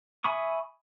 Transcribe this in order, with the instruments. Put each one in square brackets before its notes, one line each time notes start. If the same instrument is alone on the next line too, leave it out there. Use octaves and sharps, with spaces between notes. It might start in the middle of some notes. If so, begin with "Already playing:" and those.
[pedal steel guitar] E5 G#5 B5 C#6 D#6